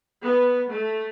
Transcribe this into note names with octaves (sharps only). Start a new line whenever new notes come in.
B3
A3